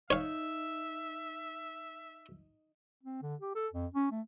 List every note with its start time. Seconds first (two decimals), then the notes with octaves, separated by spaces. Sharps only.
0.10 D#4 C#5 E5 F5
3.03 C4
3.22 D3
3.41 G4
3.55 A4
3.73 F2
3.94 C#4
4.11 A3